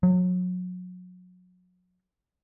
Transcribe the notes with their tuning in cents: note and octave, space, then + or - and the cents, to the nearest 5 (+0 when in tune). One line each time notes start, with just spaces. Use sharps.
F#3 -30